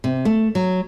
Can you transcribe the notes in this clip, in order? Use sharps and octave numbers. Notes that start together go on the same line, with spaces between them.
C3
A3
F#3